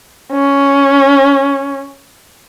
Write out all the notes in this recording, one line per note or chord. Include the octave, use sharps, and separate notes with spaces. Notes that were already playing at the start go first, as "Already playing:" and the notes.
C#4